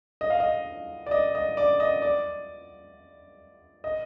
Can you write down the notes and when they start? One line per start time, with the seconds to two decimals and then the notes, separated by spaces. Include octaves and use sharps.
0.21 D#5
0.30 F5
0.40 D#5
1.06 D5
1.11 D#5
1.35 D#5
1.57 D5
1.80 D#5
2.02 D5
3.84 D#5